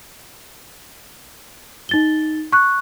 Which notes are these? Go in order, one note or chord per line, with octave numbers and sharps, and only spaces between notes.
D#4 A6 G7
C#6 F#6